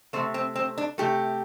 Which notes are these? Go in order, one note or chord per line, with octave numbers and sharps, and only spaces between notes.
C3 F3 A3 C4
C4
C4
D4
C3 F3 A3 G4